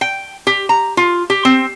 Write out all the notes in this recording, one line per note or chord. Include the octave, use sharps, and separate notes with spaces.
G5
G4
A#5
F4
G4
C4